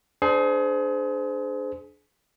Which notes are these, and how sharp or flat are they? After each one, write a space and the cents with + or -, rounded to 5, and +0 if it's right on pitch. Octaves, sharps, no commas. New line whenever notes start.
D4 +0 G#4 +30 C5 -25